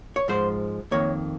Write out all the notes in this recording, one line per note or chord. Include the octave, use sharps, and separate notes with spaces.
C#5
G#2 F3 G#3 C5
F2 D#3 A#3 C#5